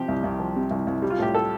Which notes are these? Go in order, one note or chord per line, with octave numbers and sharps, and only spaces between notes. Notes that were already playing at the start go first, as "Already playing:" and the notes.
Already playing: C3 F3 G4
C2
C2
F3
C3
C2
C2
G3
F4
A2 G4
A4